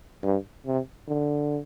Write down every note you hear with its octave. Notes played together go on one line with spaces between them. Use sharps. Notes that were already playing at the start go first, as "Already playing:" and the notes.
G2
C3
D3